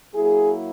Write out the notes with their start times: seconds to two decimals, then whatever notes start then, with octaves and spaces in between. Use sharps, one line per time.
0.14 F#3 A#3 E4 G#4